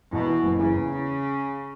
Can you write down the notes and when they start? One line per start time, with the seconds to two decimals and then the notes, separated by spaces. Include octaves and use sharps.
0.12 E2 B2
0.27 E3
0.43 F#1
0.59 C#3 E3
0.74 E2